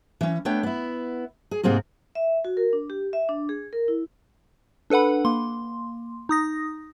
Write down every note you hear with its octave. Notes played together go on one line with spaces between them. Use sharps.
E3 C#4
A3 B3 D4 C#5 G5
B3 E4
G#4
G#2 C3 A#3 C4 G#4
E5
F#4
A#4
D4
G4
E5
D4
G#4
A#4
E4
D4 A4 B4 F#5 B5
A#3 C6
D#4 D#6 A#6